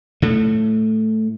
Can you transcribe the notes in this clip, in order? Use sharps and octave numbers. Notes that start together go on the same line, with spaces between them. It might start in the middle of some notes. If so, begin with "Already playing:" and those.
A2 A3